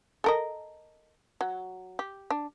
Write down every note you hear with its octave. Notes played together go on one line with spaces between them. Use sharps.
A4 A#4 D#5
F#3
G4
D4